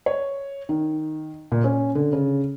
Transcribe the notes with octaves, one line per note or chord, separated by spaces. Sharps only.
C#5
D#3
A#2
C#4
D3
C#3